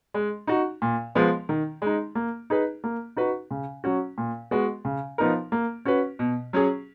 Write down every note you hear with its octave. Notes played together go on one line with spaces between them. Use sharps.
G#3
D#4 F#4
A#2
F3 G#3 B3
D#3
G#3 D#4
A#3
D#4 G#4 B4
A#3
D#4 F#4 B4
C#3
F#3 C#4 F#4
A#2
G#3 B3 F#4
C#3
F3 B3 D#4 A#4
A#3
C#4 F#4 B4
B2
F#3 C#4 G#4